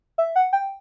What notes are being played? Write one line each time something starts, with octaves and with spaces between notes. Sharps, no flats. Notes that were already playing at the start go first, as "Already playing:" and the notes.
E5
F#5
G5